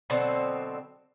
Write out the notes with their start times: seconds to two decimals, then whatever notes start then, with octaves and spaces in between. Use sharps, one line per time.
0.10 B2 D3 F#3 C4